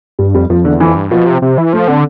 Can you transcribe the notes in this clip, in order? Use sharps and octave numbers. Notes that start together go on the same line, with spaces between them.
G2 G3
F2 G3
F2 F3
E2 D3
F2 E3
G2
B2 F3
C3
C3
E3
F3 A3
D3 C4